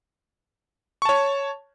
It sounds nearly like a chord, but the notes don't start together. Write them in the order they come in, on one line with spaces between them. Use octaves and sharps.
C#6 A5 C#5